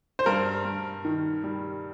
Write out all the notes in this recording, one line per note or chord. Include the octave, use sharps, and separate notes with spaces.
C5
G2 A#4
G2
D#3
G3